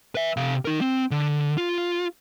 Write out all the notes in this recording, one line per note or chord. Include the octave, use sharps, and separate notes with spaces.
B4 E5
C3 F5
D#4 A#4
C4
D3
F4